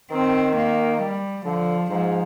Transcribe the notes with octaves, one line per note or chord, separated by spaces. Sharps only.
D#3 C4
A#3
G3
D3 F3
G#2 F3